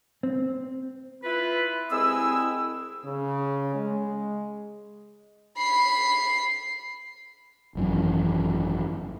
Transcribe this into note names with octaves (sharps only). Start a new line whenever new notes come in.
C4
E4 F4 B4
C2 G#3 C4 E4 D#6 E6
C#3
G#3
B5 C7
G#1 F#2 E3 C#4